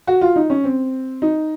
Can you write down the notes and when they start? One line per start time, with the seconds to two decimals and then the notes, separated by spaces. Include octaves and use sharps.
0.07 F#4
0.21 F4
0.36 D#4
0.50 C#4
0.64 C4
1.22 D#4